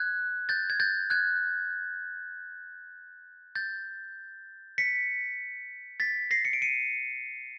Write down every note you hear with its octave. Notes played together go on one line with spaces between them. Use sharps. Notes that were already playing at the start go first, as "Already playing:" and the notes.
Already playing: F#6 G#6
G6 A6
G#6
G6 A6
F#6 G#6
G6 A6
B6 C#7
A6 B6
A#6 C7
C#7
D7
C#7 D#7